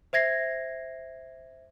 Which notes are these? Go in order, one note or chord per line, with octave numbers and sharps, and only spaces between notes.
C5 E5 G#6 A#6 C7